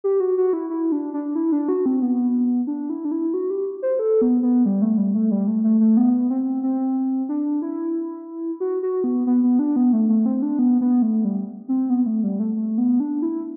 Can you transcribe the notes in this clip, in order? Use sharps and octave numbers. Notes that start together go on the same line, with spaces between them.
G4
F#4
F#4
E4
E4
D4
D4
E4
D4
F#4
C4
B3
D4
E4
D4
E4
F#4
G4
C5
A4
B3
B3
G3
A3
G3
A3
G3
A3
A3
A3
B3
C4
C4
D4
E4
F#4
F#4
B3
B3
B3
D4
B3
A3
A3
C4
D4
B3
B3
A3
G3
C4
B3
A3
G3
A3
A3
B3
D4
E4